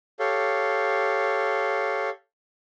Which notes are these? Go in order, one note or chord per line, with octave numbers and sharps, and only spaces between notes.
G4 A4 C#5 F5